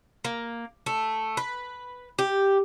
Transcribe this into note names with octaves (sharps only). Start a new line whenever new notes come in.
A#3
A3
B4
G4